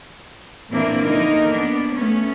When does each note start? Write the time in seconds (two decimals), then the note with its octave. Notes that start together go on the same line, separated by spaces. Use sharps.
0.71 A#2 E3 A#3 C4 D4 E4
1.05 D3 E3 A#3 D#4 A#4 D#5
1.49 A#3 B3 D4
1.93 A3 B3 C#4